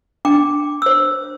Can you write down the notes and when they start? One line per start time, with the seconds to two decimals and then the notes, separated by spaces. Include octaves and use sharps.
0.25 D4 G5 D6
0.82 C5 E6